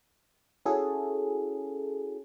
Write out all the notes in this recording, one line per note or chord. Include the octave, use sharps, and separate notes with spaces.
C#4 E4 F#4 G#4 A4